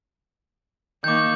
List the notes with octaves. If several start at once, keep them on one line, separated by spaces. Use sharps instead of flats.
D#3 A#3 D6 G6